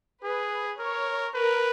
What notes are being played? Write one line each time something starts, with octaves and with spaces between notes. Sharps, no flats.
G#4 B4
A#4 C#5
A#4 B4